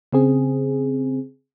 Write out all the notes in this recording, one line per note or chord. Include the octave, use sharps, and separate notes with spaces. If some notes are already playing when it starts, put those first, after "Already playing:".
C#3 C4 G#4